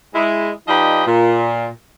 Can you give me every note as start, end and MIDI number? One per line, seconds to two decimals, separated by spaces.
0.14 0.49 56
0.14 0.49 64
0.68 1.06 53
0.68 1.06 63
0.68 1.06 67
0.68 1.06 71
0.68 1.06 74
0.68 1.06 75
1.06 1.67 46